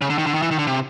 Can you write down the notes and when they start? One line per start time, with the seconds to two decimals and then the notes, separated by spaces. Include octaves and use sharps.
0.01 C#3
0.10 D3
0.18 D#3
0.26 D3
0.34 D#3
0.42 E3
0.51 D#3
0.59 D3
0.67 C3